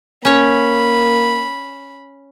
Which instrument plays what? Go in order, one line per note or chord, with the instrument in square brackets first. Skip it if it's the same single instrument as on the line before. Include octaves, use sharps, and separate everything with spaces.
[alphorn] A#3 [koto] C#4 C#5 [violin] B5